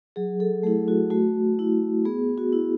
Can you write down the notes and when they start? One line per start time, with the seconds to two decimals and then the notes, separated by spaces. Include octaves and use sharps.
0.16 F#3 G#4
0.40 A4
0.63 A3 G#4
0.67 E4
0.88 F#4
1.10 A3 F#4
1.59 E4
2.05 B3 G#4
2.38 F#4
2.53 E4